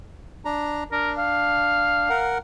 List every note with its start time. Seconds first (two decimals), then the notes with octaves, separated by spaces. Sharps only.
0.45 D4 A#5
0.92 D4 A#4
1.18 F5
2.09 A#4 F#5